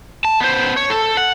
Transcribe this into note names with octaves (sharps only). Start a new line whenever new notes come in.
A5
B3 C5
C#5
A4
F#5